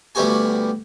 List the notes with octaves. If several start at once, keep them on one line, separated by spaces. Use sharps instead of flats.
D2 G3 B3 F#4 G4 G#5